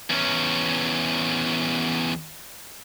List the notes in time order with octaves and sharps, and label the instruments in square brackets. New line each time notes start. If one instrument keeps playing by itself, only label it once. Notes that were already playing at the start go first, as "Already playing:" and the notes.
[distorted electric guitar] E2 C#4